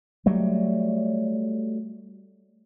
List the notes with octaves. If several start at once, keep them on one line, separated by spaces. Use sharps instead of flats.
F#3 G3 A3